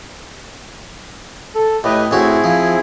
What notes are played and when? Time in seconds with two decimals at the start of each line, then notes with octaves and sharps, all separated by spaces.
1.55 A4
1.84 A2 G4 B4 D#5
2.11 A2 C4 E4 F#4 G#4
2.44 F3